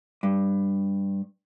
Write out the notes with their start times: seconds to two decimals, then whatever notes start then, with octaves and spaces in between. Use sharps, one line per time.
0.23 G2